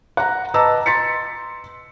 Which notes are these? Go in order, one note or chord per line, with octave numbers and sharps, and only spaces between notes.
F#5 A#5
B4 D#5 A5 A#5 D6 E6
C6 A6 B6 C#7